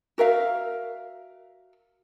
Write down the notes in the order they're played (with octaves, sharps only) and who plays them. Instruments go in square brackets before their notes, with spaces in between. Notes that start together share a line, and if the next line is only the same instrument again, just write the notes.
[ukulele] F#4 A#4 E5 F5